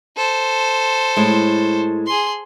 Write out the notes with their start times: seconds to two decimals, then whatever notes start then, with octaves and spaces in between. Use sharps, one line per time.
0.17 A4 C5
1.17 A2 G#3
2.07 G#4 C6